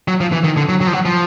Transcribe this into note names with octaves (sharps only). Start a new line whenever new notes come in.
F#3
F3
E3
D#3
D3
F#3
F#3
F3
F#3
F3